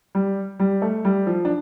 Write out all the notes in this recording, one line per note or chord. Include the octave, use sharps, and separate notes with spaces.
G3
G3
A3
G3
F3
D4